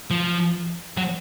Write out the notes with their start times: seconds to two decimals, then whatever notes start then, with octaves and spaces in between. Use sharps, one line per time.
0.11 F3
0.98 F#3